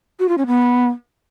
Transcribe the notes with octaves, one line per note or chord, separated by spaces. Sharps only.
F#4
F4
C#4
B3